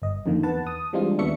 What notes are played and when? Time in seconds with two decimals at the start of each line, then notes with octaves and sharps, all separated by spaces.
0.02 G1 D#5
0.26 F2 D3 D#3 A#3
0.43 E2 B4 F#5 A5
0.67 D#6
0.93 E3 G3 G#3 C4 D4 F4
1.18 D#2 B3 D4 E5 C#6 C#7